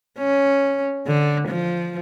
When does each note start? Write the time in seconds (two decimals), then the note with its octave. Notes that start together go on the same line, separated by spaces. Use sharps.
0.19 C#4
1.07 D3
1.48 F3